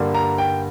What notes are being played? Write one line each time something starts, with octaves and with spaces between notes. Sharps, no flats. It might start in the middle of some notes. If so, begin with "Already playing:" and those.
Already playing: G2 D3 G3 A#3
A#5
G5